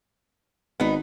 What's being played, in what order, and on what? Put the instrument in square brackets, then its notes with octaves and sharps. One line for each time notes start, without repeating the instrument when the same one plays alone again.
[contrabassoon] G#1 [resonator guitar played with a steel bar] B3 D#4